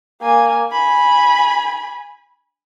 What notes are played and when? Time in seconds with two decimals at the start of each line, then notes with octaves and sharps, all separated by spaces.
0.22 A#3 G#5
0.72 G#5 B5